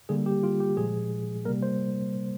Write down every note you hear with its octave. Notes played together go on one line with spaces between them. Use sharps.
D3 G3 A#3 G#4
G4
F4
G4
A#2 F3 G#3 G#4
C3 G3 A#3 A#4
C5